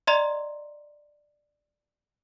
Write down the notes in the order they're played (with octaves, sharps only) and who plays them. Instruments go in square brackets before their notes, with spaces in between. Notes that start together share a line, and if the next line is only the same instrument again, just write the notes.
[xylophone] D5 D#5 A#5 C6